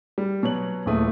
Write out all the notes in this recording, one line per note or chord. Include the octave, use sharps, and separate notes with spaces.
G3
B2 F#3 C#5 F#7
D#1 E2 A#2 A3 D#6